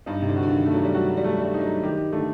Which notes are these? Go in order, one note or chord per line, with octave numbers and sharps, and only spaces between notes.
G2 D#4
C3
D3
F#4
D3
D#3
A3
F#3
G3
F#3 F#4
G3
A3
G3
D#4
F#3
D#3 G4
D3 A3